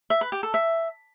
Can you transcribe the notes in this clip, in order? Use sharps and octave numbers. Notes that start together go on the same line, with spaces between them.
E5
B4
G4
A4
E5